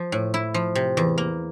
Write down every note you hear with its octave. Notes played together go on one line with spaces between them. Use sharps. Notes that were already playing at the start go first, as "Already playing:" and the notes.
Already playing: F3
A2
E4
F3
C3
E2
A#3